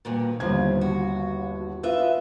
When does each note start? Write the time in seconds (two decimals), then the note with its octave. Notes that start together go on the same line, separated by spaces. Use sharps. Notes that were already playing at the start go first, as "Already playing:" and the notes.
0.05 G2 A#2 D#3
0.40 G1 D#2 C#3 F3 G#6
0.81 F#4
1.83 F4 B4 D#5 E5